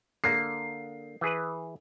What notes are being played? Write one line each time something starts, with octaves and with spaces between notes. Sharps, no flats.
D3 A#3 C7
E3 G#4 B4